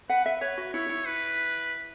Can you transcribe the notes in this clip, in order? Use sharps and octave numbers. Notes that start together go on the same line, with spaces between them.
B4 F#5
E5
B4 C#5
F#4
E4 C#5
E4
B4